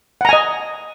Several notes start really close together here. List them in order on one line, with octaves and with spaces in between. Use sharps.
F#5 A#5 G#5 D#5